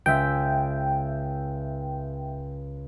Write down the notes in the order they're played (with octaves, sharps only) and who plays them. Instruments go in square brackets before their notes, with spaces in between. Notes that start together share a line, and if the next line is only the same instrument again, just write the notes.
[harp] C#2 B6 [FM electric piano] E5 G5